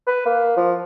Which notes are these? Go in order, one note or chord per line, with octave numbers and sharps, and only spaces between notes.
B4
A#3
F3